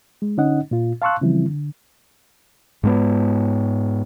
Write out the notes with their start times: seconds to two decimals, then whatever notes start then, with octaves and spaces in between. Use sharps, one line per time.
0.22 G#3
0.37 D3 C#4 D#4 D#5 F#5
0.71 A#2 F4
1.02 F5 A5 C6 C#6 E6 F#6
1.21 C#3 E3 F3 G3 C4 E4
1.48 D3
2.83 G#2 G#3 B3